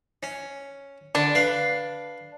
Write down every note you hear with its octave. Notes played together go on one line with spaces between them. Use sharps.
C#4
D3 D4
B4 F5